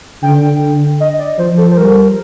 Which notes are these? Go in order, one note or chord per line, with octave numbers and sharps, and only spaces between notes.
D3 G5
D#5
D5
F3 C5
A4
C5
G3 A#4